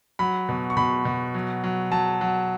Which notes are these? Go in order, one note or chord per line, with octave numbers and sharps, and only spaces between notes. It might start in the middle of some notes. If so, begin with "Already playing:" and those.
F#3 B5
B2
C#6
B2 B5
B2
F#3
F#3
F#3 A5
F#3